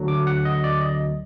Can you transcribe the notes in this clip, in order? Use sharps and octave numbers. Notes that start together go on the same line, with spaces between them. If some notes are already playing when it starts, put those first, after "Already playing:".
Already playing: D2 D3 F#3
D6
F#5
D#5
D5
D#5